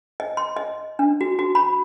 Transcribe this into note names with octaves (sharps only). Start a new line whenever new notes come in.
D#5
C6
D#5
D4
F#4
F#4
B5